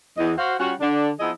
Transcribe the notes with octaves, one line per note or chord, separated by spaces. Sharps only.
E2 E3 D#5
F#4 C5 F5
G3 C#4 F4 F#4
D3 D4
F3 B3 D#4 E4 G#4 D#5